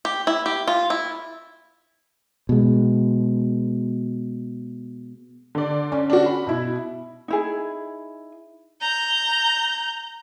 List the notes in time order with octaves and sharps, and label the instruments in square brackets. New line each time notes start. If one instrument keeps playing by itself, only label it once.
[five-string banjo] G4
E4
G4
F4
E4
[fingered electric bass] B2 G#3
[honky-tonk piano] D3 D5
[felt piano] C#4
[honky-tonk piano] D4 F#4
B5
[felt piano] B2 E4
[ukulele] D#4 E4 G#4
[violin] A#5 G6